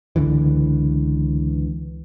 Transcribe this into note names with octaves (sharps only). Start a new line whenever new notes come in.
C#2 D3 E3